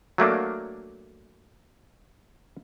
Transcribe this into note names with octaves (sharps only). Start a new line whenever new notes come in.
F#3 A3 A#3 D4